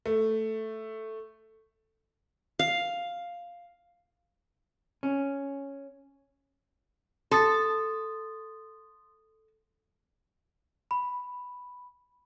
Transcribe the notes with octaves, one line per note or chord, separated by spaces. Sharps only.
A3
F5
C#4
A4 C6 D#6 A6
B5